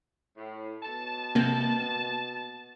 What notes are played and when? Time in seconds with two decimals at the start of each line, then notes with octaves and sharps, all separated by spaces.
0.37 A2
0.83 B2 A5
1.35 C3 A#3